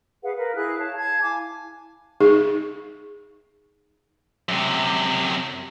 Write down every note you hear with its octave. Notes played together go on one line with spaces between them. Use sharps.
G#4 B4 F5 F#5
A#4 B4
E4 G#4 F5 F#6
C#5 A5
F5 A5 G#6
E4 G#5 D6
D#4 G#4
F#2 C3